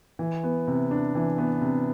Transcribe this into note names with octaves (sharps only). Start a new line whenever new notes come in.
E3
B3
C3
D4
E3
B3
C3